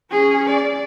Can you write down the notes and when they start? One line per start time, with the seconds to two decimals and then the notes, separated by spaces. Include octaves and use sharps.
0.11 C#4 G#4
0.50 D5